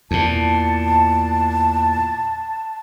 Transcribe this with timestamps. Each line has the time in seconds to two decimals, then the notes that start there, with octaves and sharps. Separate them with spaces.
0.11 E2 A#2 A5